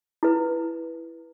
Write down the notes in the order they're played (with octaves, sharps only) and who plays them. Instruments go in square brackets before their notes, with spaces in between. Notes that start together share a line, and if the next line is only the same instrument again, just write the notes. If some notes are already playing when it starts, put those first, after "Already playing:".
[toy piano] E4 B4